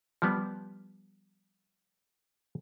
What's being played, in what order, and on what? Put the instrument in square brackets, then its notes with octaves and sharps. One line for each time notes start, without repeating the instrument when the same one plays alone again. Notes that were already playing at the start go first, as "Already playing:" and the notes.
[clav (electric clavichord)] F3 G3 B3